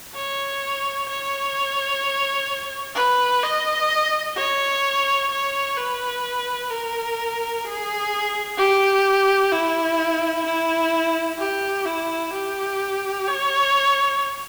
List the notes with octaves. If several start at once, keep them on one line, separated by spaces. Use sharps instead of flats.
C#5
C#5
B4
D#5
C#5
C#5
B4
A#4
G#4
G4
E4
E4
G4
E4
G4
C#5